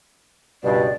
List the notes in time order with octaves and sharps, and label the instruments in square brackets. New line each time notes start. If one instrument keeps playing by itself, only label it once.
[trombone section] C#2 G2 B2 [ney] D5